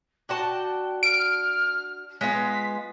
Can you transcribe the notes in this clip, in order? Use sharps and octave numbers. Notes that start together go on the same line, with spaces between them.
D4 F#4 G5 A5
F6 D7
G#3 B3 F4 B6